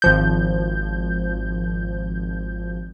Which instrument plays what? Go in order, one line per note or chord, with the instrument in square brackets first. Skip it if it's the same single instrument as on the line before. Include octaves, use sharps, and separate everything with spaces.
[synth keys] G#1 F3 G6